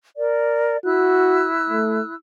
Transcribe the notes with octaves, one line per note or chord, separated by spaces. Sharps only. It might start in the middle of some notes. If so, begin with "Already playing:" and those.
A#4 D5
E4 F#4 E6 F#6
A3